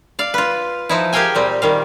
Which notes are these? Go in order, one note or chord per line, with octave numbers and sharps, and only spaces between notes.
D5 F5
F4 B4
F3 D#4 E4
G4 G#4 A#4 F5 G5 G#5
A#2 G3 C4
D#3 G3 F5